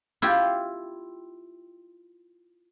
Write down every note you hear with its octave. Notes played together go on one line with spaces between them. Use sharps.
E4 F4 G4